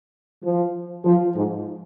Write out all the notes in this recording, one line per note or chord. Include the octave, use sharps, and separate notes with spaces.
F3
F3
G#2